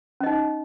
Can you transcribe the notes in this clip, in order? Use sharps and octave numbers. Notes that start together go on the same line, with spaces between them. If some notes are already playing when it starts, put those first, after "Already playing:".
C#4 D#4 D#5